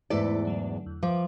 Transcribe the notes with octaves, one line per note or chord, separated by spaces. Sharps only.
E2 G#2 A3 E4 B4 D5
D3 F#3 A3
E2
F3 D6